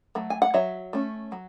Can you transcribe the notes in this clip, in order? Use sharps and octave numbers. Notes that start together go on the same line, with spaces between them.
F#3 A3
G#5
F#5
F#3 C#5 E5
A3 C#4
F#3